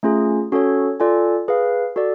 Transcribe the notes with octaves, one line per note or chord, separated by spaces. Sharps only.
A3 C#4 F4 G#4
C#4 F#4 A4 C#5
F4 A4 D5 G#5
G#4 B4 F5
F#4 A4 D5